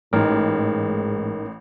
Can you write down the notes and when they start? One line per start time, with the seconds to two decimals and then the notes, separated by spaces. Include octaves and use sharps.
0.13 A1 G#2 D#4 A#4